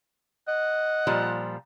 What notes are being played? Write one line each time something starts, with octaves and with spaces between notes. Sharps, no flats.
D#5 F#5
A#2 F3 G3